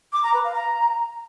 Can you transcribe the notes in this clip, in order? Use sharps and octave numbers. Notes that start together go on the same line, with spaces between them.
D6
A#5
B4
F5
A#5